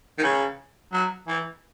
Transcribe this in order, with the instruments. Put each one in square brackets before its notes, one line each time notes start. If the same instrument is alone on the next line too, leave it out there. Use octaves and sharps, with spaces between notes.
[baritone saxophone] D#3
C#3
F#3
E3